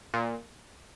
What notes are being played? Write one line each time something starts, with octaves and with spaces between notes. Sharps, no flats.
A#2